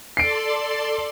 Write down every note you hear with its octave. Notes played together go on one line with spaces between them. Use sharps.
A4 D5 C6 C7 D7